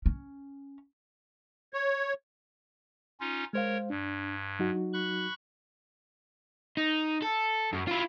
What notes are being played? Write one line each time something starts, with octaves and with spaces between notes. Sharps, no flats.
C#4
C#5
C#4 D#4 F4
G#3 A#4 C5 C#5 F5
G2 D4
F#3 D#4 F#4
B5 C#6 F#6
D#4
A4
F#2
E4 F4